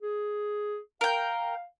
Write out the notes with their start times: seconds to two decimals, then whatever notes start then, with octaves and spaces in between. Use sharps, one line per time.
0.02 G#4
1.01 A#4 F5 G5